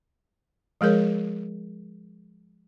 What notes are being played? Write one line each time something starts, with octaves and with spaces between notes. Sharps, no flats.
F3 G#3 G#4 A#4 C#5